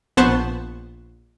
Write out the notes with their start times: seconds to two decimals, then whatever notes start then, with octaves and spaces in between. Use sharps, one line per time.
0.17 A#1 B3 C5 A5 C#6 F#6